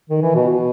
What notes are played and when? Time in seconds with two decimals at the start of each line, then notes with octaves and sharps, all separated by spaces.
0.09 D#3
0.22 E3
0.35 B2
0.48 B2